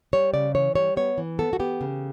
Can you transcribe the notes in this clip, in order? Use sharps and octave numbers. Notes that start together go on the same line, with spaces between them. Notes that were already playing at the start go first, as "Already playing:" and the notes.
G3 C#5
C#3 D5
E3 C#5
G3 C#5
B3 C#5
E3
B3 A4
F#4
B3 G4
C#3